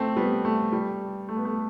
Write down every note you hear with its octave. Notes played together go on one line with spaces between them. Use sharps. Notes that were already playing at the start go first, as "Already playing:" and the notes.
Already playing: A3 C4
G3 B3
A3
G3
A3
B3
A3